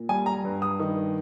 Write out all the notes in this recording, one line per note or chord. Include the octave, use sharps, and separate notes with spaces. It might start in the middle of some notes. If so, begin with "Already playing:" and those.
Already playing: A#2
G3 G#5
A#5
G2
D#6
D#3